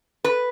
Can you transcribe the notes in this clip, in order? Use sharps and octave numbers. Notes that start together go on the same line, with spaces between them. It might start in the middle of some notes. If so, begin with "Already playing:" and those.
B4